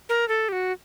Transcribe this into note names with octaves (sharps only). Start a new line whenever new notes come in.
A#4
A4
G4
F#4